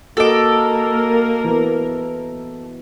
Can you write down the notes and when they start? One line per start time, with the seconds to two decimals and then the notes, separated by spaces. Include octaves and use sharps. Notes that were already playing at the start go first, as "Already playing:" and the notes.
0.17 A#3 F#4 A4 A#4 D#5 D6
1.44 E3 B3